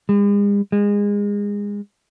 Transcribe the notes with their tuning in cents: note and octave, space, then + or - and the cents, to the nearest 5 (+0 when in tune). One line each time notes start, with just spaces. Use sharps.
G#3 -45
G#3 -25